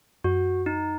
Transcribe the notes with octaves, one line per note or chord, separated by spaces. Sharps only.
F#2 F#4
D#4